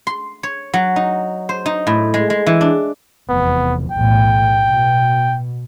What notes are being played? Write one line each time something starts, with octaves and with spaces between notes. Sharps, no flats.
C6
C#5
F#3
D#4
C5
D#4
A2
G#3
G#3
E3
D4
F1 E2 B3
B1 E2 A2 G5
B2